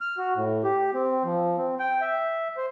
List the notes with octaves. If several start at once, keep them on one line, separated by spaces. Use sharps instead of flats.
F6
F#4
A2
G4
C4
F3
C4
G5
E5
C5